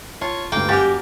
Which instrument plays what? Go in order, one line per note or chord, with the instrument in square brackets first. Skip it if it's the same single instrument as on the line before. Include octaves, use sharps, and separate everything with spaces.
[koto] F4 [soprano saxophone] C#5 [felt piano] A5
[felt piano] D2 G2 [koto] A#3 [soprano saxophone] G5
[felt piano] F#2 G#5 A6 [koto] F#4 A#4 [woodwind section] G4